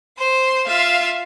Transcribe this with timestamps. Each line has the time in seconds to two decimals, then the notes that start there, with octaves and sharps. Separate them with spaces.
0.18 C5 C6
0.67 F4 E5 F5